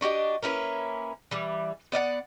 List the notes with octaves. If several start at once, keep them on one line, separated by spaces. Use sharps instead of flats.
D4 F#4 G4 D#5
A#3 C#4 E4 B4
E3 G3
B3 D5 D#5 F#5